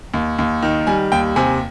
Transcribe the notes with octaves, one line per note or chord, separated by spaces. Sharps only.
D#2
D#2
D#3
G3 G#5
D#2 G5
C3 G#5